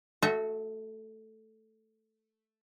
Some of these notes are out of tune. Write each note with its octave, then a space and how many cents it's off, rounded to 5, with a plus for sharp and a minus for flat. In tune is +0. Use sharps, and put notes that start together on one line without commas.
A3 +0 F#4 -5 E5 -45